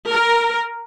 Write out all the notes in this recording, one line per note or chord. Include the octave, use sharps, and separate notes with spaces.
A#4